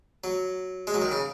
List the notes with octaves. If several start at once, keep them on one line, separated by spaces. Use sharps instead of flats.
F#3
G#3
F#3
D#3
C#3